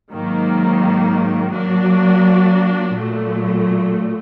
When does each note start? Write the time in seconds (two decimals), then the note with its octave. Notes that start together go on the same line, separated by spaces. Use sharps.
0.11 G#2 D#3 F#3 A#3
1.52 F#3 A#3 D4 F#4
2.94 A#2 F#3 A3